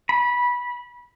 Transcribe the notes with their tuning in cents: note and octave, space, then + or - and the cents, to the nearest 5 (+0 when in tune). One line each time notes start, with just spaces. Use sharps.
B5 -20